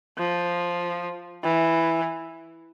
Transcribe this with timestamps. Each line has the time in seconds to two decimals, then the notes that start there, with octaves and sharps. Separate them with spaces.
0.18 F3
1.43 E3